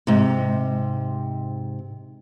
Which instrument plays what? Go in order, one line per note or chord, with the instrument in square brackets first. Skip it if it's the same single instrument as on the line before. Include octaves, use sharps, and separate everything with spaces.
[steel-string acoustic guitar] G#2 C3